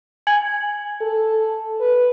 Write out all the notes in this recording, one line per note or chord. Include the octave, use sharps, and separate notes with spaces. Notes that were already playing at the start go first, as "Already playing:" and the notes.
G#5 G#6 F#7
A4
B4